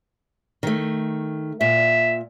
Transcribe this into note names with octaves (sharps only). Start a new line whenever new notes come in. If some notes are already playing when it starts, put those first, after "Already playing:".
D#3 A3
A#2 E5